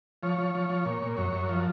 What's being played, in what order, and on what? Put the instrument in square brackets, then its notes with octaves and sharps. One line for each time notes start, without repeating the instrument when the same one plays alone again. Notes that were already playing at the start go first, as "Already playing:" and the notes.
[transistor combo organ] F3 C#5
F3
F3
F3
A#2
A#2
F#2 C#5
F#2
F3